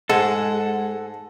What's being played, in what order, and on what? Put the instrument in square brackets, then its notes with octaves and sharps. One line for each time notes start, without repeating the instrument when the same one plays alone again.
[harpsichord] G#2 [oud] G#3 [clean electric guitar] A4 [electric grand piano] F#5